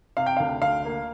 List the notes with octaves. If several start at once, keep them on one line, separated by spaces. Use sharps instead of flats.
C3 F5
G5
D2 F5
D2 F5
A#3